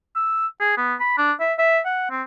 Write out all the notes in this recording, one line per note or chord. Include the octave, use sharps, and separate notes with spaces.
E6
G#4
B3
B5
D4
E5
E5
F#5
C4